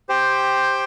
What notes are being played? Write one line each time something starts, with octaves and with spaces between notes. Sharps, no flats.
G4 C5 G5